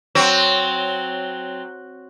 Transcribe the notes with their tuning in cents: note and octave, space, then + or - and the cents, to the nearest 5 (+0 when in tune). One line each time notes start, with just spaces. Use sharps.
F#3 +0 C4 +0